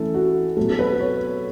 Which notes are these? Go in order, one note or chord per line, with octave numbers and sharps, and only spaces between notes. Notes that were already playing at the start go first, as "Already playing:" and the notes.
Already playing: E3 A3 C#4 A4
F#4
B2 F#3 A3 A4
A4
B4
C#5